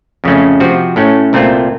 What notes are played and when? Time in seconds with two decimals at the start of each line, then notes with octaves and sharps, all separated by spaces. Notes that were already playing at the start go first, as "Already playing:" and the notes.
0.24 F2 C#3 A3 C#4
0.60 C3 F3 C4 F#4
0.96 A2 A3 C#4
1.33 C2 A#2 A3 C4 F4